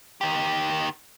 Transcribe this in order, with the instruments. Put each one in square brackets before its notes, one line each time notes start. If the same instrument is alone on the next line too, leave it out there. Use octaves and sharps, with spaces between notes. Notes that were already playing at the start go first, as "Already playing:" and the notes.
[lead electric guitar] D#3 G4